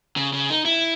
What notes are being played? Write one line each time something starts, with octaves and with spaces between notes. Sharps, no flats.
C#3
C#3
D#4
E4